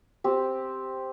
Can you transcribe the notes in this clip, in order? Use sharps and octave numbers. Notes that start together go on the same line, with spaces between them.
C4 G4